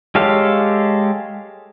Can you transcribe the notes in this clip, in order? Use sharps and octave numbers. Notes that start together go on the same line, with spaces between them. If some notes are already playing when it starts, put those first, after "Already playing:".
G#3 G4 A4 C#5 F5